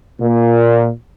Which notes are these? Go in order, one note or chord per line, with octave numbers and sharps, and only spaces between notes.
A#2